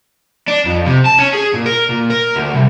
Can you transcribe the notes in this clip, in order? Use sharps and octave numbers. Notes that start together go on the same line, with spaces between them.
D4
F2
C3
A5
C#4
G#4
A#2
A#4
A#2
A#4
D2
C2